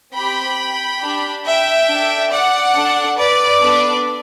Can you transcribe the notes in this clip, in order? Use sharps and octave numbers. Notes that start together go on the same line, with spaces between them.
C4 G4 G5 B5
D4 G4
E5 G5
D4 A4
D5 F#5
D4 A4
B4 D5
B3 D4 A4